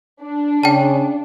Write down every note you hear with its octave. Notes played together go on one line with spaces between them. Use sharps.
D4
C#3 G5 A5